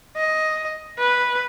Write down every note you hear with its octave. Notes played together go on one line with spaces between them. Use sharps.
D#5
B4